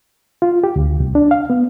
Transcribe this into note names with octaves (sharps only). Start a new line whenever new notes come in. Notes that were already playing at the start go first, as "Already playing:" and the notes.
F4
G4
D2
C2
D4
F5
B3